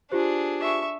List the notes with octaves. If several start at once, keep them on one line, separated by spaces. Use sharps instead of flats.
D4 F4 G4 G#4 C5
E5 C#6